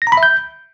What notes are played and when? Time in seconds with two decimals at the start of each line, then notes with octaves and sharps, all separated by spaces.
0.02 A#6
0.07 A#5
0.12 B5
0.17 E5
0.23 G6